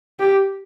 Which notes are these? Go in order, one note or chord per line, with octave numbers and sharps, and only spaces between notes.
G4